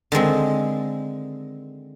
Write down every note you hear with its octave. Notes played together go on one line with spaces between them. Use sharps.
D3 D#3 G#3 C4